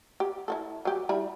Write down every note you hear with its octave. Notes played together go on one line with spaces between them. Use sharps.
G4
E4 F#4 A4
F#3 G4
G3 E4 B5